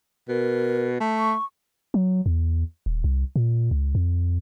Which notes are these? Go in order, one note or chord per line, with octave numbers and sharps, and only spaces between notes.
B2 A#4
A3
C#6
F#3
E2
D#1
C2
A#2
C#2
F2